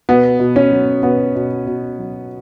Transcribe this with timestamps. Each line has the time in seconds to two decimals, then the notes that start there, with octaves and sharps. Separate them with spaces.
0.09 B2 B3
0.40 B2
0.56 C#4
0.71 F#3
1.03 B2 B3
1.35 B2
1.67 B2
1.99 F#3